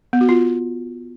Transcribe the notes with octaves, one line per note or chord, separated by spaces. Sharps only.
B3
F#4
F4